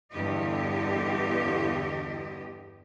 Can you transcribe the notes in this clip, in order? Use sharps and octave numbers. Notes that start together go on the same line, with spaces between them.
E2 G2 D3 G4 D#5